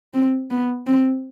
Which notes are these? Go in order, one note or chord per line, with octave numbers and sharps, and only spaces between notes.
C4
B3
C4